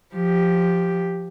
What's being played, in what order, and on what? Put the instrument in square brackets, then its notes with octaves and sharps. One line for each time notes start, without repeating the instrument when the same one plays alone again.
[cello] F3 G4